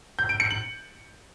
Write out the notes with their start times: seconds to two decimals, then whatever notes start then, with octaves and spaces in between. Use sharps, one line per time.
0.19 G6
0.29 D7
0.40 C#7
0.51 F#7